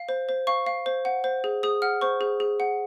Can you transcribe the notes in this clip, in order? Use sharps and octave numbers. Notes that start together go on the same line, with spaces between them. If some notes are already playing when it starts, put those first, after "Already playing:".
Already playing: F5
C5
C5
F5 C#6
F5
C5
F#5
C5
G#4
G#4 D#6
F#5 F6
C5 C#6
G#4
G#4
F#5